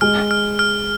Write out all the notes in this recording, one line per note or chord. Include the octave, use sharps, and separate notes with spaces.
G#3 F6
F6
F6